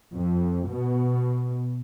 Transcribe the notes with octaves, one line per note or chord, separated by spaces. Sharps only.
F2
B2